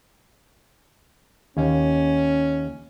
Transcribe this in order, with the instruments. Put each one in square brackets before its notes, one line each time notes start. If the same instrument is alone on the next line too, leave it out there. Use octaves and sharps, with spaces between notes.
[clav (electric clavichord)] D#2 [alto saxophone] C#4